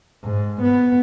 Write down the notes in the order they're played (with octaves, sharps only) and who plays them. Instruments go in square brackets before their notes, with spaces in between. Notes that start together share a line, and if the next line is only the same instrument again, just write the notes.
[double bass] G#2
B3